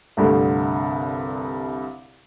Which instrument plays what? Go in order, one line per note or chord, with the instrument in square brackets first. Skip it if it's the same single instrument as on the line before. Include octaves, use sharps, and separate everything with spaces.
[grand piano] C2 G2 D3 A3